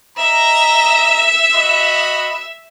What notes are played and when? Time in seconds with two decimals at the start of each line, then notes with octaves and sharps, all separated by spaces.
0.17 D#5 E5 A#5
1.54 F#4 D#5 B5